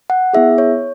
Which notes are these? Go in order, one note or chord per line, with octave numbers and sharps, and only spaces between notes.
F#5
B3 E4 G#4 E5
C#5